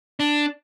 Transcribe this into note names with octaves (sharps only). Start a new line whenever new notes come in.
D4